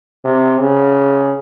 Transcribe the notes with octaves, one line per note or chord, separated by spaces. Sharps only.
C3
C#3